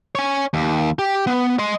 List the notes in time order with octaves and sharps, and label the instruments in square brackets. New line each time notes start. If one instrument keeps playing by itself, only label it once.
[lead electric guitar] C#5 G#5
D#2
G4
B3
D#5 C6